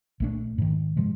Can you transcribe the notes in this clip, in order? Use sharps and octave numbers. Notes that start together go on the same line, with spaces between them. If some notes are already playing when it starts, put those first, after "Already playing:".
A#1 A3 D4
G#2 D#3
G#2 C3 F3 G#3